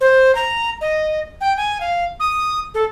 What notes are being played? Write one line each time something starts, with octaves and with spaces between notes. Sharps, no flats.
C5
A#5
D#5
G5
G#5
F5
D#6
A4